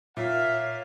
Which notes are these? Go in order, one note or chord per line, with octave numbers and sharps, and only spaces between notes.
A#2 C#5 E5 F5